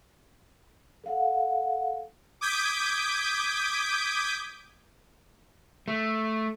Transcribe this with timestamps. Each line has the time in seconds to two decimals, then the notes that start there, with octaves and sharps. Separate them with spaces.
1.04 A4 F5 F#5
2.41 D6 D#6 G6 G#6 B6 D7
5.88 A3